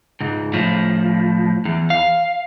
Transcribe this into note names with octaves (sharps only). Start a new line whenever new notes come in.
C#2 G#2
A2 F3
E2
F5